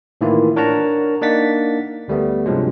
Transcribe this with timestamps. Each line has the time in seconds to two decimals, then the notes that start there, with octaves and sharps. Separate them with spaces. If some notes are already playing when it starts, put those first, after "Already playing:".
0.21 A2 D#3 E3 A#3 E4 F4
0.56 D4 A#4 C#5 F#5 A5 A#5
1.21 A#3 D4 D#4 F#5 A6 B6
2.08 D2 G3 A3 B3
2.46 G2 C3 F3 F#3 G#3